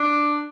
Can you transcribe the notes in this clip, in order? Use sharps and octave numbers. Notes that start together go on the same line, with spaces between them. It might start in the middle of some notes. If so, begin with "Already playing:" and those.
Already playing: D4